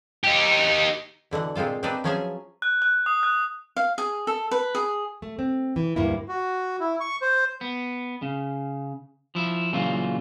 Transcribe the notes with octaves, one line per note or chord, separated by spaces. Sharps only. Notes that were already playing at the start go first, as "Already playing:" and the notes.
D#4 G4
B2 D3 E3 F#5
A#2 G#3 C4 F4 A4
C4 D4 D#4 B4 D5
F3 F#3 C#4 G#4 E5 G#5
F#6
F#6
D#6
F#6
F5
G#4
A4
B4
G#4
A3
C4
E3
D2 G2 A#3 E4
F#4
E4
C#6
C5
B3
C#3
F3 E4
A#2 C#3 E3 F#3 F4